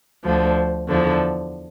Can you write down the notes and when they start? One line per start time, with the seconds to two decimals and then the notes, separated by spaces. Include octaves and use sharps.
0.24 D2 D3 F3
0.89 E2 D3 F3